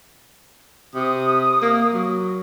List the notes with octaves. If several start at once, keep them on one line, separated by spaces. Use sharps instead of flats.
C3 D#6
A#3
F#3